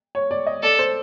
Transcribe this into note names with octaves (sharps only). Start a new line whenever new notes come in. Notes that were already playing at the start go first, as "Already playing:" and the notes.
C#5
D5
D#5
A4 D5
C5